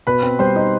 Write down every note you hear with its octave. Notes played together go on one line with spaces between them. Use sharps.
B2 B4 B5
C4
G3 C5 C6
D#4